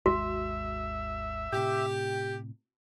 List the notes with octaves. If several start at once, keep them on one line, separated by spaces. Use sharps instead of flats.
G#1 D#2 G#3 F#4 E5
A2 C3 G4